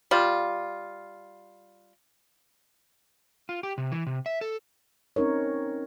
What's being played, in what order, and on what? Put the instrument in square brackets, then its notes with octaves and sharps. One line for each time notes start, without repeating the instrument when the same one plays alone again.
[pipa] G3 F4
[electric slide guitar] F4
G4
C3
E3
C3
E5
A4
[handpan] C4 C#4 D#4 A#4 C#5